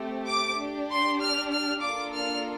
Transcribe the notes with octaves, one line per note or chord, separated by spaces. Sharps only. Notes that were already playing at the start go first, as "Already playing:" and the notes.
Already playing: A3 C4 G4
D6
D4 G4
C6
F6
F6
A#3 D4 F4 A4 D6
F6